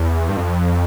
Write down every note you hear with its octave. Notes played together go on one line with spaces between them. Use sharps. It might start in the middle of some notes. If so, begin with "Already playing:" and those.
Already playing: E2
G2
F2